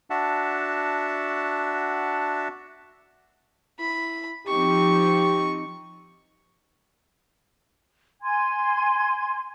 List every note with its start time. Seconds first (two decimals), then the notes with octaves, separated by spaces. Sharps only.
0.10 D4 F#4 E5 F#5 A5
3.80 E4 B5
4.47 F3 C4 D#4 G4 C#6
8.21 G#5 C6 G#6